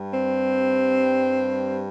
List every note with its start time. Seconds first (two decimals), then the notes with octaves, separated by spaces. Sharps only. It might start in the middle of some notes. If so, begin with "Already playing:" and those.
Already playing: G2 G3
0.13 C4